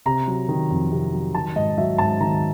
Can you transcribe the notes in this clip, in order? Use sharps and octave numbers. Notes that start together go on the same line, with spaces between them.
C3 A#5
F#3
D#3
F2
C3
F#3
D#3 A5
G#2 D#5
F#3 E5
G#2 A5
D#3 A#5